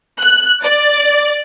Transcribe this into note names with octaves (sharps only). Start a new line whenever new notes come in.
F#6
D5